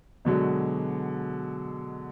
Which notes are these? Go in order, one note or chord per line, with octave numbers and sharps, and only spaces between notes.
B2 D3 F#3 G#3